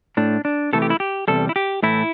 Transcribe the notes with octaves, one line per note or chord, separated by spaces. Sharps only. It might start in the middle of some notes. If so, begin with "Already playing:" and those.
A2 A3 D4
D4
C3 E3 A3 A4
G4
E4
G4
E2 C3 G3 A4
E4
G4
A2 E3 A3 E4